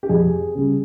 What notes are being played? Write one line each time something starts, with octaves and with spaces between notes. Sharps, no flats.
G4
F2 G#4
C#3 G3